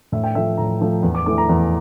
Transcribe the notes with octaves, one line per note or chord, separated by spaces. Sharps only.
A2 E5
G5
F3 A3 E5
A2 A#5
F3 A3
E2
D6
E3 A3 D6
A#5
E2